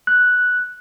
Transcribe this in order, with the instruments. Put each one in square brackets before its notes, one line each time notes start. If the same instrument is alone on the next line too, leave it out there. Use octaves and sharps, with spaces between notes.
[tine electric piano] F#6